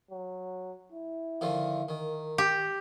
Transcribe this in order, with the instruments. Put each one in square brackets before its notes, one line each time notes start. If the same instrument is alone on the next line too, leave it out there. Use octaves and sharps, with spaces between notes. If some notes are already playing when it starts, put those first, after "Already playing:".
[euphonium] F#3
E4
[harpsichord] D3 D#3 F3
[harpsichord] D#3 [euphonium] A#4
[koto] G4